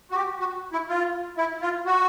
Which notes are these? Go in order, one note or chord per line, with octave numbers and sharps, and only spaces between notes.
F#4
G4
F#4
E4
F4
E4
F4
F#4